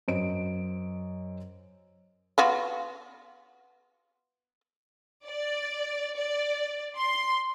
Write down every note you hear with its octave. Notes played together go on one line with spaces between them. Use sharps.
F#2 C5 D#5 D7
B3 F4 F#4
D5
D5
C6